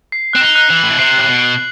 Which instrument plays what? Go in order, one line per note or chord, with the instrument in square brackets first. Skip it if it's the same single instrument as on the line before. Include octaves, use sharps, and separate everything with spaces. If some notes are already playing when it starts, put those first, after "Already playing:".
[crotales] C7
[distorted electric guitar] C4 [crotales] F#6
[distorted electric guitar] D#4
[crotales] F#6
[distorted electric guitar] E3
[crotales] F#7
[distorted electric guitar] A2
B2
[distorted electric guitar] C3 [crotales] C7
[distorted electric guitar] A2 [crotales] F#6
[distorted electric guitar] B2
[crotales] F#6